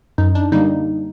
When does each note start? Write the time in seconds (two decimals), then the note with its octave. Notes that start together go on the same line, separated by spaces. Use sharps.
0.18 F#2 D#4
0.35 D4
0.52 D3 G3 A#3 D#4